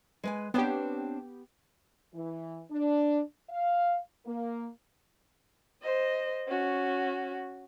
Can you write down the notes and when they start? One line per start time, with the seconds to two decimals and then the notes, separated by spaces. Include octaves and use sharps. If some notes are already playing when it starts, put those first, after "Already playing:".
0.24 G#3 B4 G#5
0.54 B3 C4 D4 G4 C#5
2.13 E3
2.70 D4
3.49 F5
4.26 A#3
5.82 C5 D#5
6.48 C#4 F#4